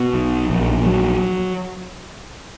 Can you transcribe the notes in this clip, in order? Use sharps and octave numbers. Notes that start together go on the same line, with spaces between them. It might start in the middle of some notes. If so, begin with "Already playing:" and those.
Already playing: B2
B1
A#1
F#3